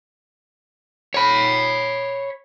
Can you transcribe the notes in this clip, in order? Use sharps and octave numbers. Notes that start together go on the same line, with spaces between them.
C#5 B5